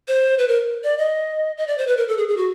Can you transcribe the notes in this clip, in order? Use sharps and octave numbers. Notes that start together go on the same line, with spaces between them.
C5
B4
A#4
D5
D#5
D#5
D5
C5
B4
A#4
A4
G#4
G#4
F#4